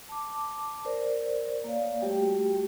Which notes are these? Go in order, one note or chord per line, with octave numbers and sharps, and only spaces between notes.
A5 D6
A#4 C5 D5
A#3 C#5 D5 F5
G3 A3 F#4 G4 G5